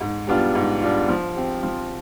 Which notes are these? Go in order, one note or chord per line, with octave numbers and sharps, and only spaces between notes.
G#2
G3 B3 D4 F4
G#2
G3 B3 D4 F4
F3
C4 G4
F3